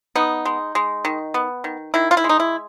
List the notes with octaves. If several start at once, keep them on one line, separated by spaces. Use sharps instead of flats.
B3 D#4
G#3
G#3
D#3
B3
D#3
D#3 E4
F4
E4
G#3
D#4
E4